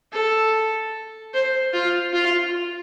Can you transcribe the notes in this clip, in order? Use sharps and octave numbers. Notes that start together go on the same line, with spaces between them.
A4
C5
F4
F4